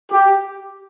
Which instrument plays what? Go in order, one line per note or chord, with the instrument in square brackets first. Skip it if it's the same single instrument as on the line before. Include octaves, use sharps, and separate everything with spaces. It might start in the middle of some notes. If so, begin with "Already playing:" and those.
[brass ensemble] G4